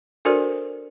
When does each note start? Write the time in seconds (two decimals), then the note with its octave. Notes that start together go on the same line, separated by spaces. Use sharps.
0.25 D4 F#4 A4 A#4 C5 D5